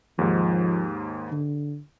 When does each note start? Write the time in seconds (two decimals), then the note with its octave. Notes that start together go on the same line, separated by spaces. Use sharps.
0.18 D#2 G#2 F3
1.32 D3